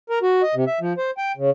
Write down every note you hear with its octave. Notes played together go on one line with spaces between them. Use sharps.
A#4
F#4
D#5
C3
E5
F3
C5
G5
C#3